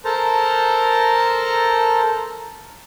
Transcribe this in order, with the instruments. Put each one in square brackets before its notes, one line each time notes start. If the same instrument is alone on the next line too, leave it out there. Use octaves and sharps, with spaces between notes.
[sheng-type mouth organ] A4 A#4 C5 A5 A#5